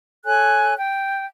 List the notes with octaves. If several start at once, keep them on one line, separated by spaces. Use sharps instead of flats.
A4 C#5 G#5 F#6
G5